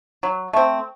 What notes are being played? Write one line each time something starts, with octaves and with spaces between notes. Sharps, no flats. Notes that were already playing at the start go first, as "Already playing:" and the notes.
F#3
A3 C4